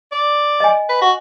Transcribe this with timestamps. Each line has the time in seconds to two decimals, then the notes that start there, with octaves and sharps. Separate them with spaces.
0.12 D5
0.60 D#5 G#5
0.89 B4
1.02 F#4